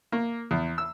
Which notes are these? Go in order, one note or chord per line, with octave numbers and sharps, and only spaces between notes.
A#3
E2
E6